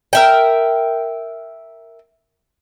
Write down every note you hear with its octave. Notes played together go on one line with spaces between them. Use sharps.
A#4 E5 G5